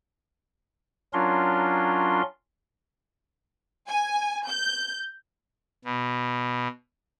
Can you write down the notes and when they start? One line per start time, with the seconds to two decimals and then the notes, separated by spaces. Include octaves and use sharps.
1.13 F#3 C#4 D4 F4 A#4 C6
3.88 G#5
4.48 G6
5.84 B2